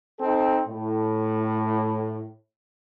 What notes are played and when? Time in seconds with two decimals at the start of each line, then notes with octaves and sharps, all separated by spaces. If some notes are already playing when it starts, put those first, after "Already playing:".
0.20 C4 D#4 A4
0.67 A2